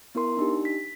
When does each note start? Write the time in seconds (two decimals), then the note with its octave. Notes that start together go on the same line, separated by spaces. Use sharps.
0.15 B3 E4 A#4 C6
0.37 D4 D#4 G4
0.65 B6